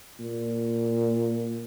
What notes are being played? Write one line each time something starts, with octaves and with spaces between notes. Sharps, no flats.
A#2